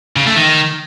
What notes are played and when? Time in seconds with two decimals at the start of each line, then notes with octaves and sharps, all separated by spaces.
0.17 C#3
0.27 A3
0.37 D#3